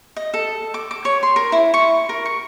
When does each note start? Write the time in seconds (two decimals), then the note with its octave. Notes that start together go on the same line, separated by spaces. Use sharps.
0.16 D#5
0.34 A4
0.74 D6
0.91 D6
1.05 C#5
1.23 C6
1.36 A#4
1.52 E4
1.74 C#6
2.09 A#4
2.25 C#6